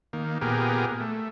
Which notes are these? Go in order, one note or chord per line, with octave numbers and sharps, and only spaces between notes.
D#3 A#3
A#2 B3 G4 G#4 A#4
A3